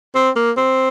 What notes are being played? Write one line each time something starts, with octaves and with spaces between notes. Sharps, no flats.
C4
A#3
C4